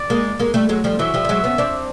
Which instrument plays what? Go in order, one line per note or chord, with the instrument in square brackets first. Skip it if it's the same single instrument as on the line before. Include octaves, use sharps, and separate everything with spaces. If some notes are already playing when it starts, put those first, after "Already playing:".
Already playing: [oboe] D5
[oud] G#3 A#3
G#3 A#3
G3 A3
F#3 G#3
F3 G3
[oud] E3 F#3 [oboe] E5
[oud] F3 G3
G3
F#3 G#3
B3 C#4
C4 D4